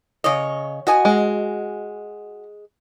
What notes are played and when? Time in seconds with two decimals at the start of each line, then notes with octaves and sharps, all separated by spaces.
0.24 C#3 C#5 D#5
0.87 F#4 D#5 G#5
1.05 G#3